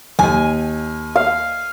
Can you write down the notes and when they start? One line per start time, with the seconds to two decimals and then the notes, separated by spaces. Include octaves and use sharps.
0.19 D#2 G#5
1.16 F5